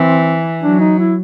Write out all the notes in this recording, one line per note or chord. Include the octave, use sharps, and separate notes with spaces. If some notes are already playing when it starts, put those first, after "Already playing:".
Already playing: E3 C4
F#3 D4
D#4
E4